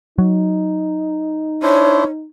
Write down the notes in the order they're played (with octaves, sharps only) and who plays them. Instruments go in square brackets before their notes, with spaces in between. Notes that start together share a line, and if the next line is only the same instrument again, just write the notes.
[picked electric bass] F#3 [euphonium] D#4
[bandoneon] D4 E4 C5 [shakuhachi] C#5